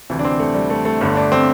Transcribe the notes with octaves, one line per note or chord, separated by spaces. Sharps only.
D2 C3 E3
D4
C4
A3
G3
A3
A3
G1 G2 D3 A3
D4
C4